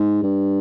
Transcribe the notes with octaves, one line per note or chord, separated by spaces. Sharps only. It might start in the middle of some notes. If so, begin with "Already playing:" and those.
Already playing: G#2
G2